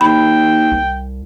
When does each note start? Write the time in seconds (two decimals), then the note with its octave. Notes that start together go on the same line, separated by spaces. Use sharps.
0.01 D#2 G5 B5
0.72 C2